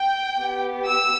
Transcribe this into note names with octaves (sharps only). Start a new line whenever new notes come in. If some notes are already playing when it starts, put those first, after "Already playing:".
Already playing: G5
B3 G4
E6